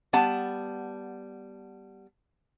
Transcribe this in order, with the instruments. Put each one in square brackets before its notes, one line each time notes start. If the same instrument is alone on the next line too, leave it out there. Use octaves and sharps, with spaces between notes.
[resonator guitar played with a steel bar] G3 B3 F#5 A5